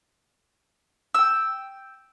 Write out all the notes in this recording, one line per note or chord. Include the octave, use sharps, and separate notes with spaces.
G5 E6